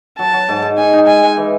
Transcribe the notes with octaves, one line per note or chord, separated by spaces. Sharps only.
F#3 A5
F#3
G#2
G#2
D#4 G#5
D#4
G#3 G#5
G#3
E3